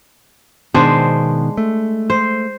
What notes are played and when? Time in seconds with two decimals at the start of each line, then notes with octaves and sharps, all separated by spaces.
0.74 B2 D#3 G#3 B3 D4 C5
1.57 A3
2.10 C5